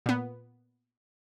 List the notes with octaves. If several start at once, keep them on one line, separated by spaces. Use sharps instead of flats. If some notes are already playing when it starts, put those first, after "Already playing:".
A#2 B3